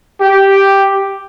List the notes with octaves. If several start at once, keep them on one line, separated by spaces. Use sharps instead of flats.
G4